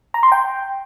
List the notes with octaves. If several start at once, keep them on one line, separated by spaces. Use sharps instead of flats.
A#5
C6
G5